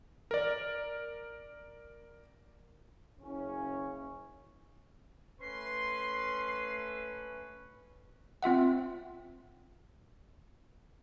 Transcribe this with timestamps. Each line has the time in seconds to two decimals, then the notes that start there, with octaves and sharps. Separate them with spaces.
0.31 A#4 D5
3.21 F#1 C#3 C#4
5.41 A3 C#4 B4 C6 C7
8.43 C4 F4 E5 F#5